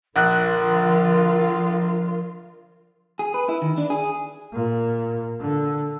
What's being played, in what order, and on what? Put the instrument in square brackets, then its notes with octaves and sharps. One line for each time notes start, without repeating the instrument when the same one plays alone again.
[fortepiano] A#1 F#6 [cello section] D3 F3 F4 [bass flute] A#4
[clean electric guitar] G#4
B4
E4
D#3
D4
G#4
[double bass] A#2
D3